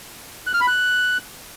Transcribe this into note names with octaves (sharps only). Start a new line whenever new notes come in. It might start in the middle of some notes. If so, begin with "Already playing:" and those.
F#6
F6
B5
F#6